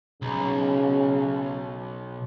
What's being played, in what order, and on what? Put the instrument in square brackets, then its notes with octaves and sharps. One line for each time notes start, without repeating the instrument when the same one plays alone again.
[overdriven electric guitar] B1 [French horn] C#3